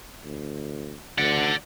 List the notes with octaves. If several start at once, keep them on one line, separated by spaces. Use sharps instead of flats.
D2
D2 D5 F#5